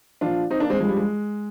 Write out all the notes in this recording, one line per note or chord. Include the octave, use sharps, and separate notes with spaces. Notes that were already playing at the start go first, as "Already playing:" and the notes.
A#2 F3 D4 F4
C4 D#4
A#3 D4
G#3 C4
G2 F3 G#3
G3
G#3